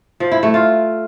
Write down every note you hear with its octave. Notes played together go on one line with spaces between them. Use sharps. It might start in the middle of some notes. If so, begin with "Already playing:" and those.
F3
E4
A3
F4